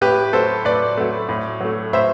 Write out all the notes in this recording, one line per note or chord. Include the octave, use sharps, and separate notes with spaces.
A2 G4 B4
F#3 A3 A4 C5
A2 B4 D5
F#3 A3
A2
F#3 A3
A2 C5 E5